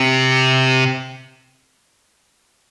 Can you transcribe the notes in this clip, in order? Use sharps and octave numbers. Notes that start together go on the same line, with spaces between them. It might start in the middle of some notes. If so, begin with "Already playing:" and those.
Already playing: C3